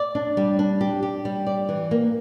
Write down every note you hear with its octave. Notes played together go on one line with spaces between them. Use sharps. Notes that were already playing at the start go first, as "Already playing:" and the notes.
Already playing: D5
D4
G3
D4
G4
G4
G3
D5
E3
A#3